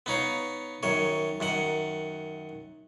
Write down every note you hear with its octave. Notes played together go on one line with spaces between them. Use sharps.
B3 D#4 C#5 F5
F#2 D#3 C#5
F#2 D#3 F#5